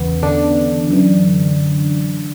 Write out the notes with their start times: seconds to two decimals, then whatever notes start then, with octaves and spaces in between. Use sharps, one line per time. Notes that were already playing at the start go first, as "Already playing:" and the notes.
Already playing: E2 C#3 E3 B3
0.23 D3 D4
0.90 F#2 E3